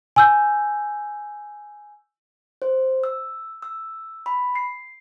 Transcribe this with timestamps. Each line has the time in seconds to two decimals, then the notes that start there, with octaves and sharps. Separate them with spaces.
0.16 G#5 E6 G6
2.62 C5
3.04 E6
3.62 E6
4.26 B5
4.55 C7